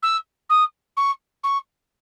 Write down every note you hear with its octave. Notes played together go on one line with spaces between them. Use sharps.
E6
D#6
C#6
C#6